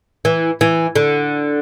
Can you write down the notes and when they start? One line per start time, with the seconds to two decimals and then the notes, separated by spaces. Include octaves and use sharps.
0.25 E3
0.61 E3
0.96 D3